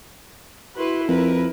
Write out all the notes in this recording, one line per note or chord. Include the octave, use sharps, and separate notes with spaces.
E4 F#4 B4 C6
F2 A#4 B4